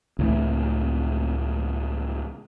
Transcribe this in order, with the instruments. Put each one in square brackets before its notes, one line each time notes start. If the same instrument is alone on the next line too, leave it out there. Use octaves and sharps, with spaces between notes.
[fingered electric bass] C#2 A2 E3